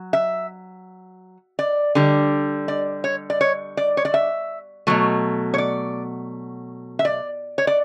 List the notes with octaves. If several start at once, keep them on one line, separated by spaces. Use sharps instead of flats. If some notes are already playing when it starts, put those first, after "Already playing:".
Already playing: F#3
E5
D5
D3 G3
D5
C#5
D5
C#5
D5
C#5
D5
E5
B2 F#3 A3
C#5
D5
E5
D5
C#5
D5